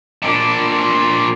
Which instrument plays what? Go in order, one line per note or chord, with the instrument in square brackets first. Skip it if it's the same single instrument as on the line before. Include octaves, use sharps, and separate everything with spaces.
[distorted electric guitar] A#2 D4